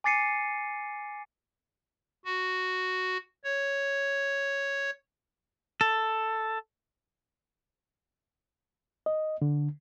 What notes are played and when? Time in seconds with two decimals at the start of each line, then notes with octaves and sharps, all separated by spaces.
0.04 G#5 D6 A6 C7 C#7 D#7
2.25 F#4
3.44 C#5
5.81 A4
9.06 D#5
9.42 D3